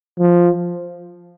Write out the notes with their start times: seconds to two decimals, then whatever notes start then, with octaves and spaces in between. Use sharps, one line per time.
0.19 F3